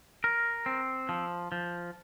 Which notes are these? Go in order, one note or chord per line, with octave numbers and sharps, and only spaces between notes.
A#4
C4
F3
F3